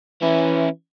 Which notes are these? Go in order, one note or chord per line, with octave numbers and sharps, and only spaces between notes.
E3 C#4 E4